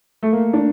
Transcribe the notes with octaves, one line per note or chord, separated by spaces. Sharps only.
A3
A#3
D4